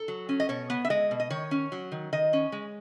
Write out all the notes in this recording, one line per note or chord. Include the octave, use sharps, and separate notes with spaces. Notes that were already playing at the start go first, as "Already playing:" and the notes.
Already playing: A4
F#3
C#4
D#5
B2 C#5
B3
E5
G#3 D#5
B2
D#5
D#3 C#5
C#4
F#3
D#3
D#3 D#5
C#4
G#3